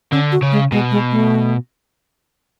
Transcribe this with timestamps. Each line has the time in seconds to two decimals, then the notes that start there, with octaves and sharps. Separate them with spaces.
0.12 D3 C#4
0.32 F#4
0.42 C#3
0.52 G#3
0.72 B2 G#3
0.91 G#3
1.11 A3